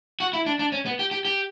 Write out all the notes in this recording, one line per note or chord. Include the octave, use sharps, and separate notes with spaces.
F#4
E4
D4
D4
C#4
B3
G4
G4
G4